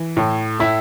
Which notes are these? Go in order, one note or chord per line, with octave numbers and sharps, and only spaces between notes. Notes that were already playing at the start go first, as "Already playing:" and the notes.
Already playing: E3
A2
A2 E4